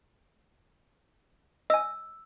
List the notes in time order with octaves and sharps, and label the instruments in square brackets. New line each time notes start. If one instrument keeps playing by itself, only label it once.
[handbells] D#5 G#5 [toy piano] E6